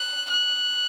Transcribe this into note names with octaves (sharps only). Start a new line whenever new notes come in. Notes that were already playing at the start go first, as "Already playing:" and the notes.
Already playing: F#6
F#6